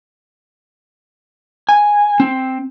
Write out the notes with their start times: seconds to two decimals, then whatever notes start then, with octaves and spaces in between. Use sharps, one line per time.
1.69 G#5
2.20 C4